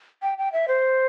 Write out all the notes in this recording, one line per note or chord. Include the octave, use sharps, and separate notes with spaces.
G5
G5
E5
C5